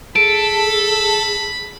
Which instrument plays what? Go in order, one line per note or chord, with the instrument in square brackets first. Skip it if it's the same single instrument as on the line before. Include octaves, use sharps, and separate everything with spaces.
[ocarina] G#4 [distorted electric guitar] A4 [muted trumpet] B5 [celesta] D7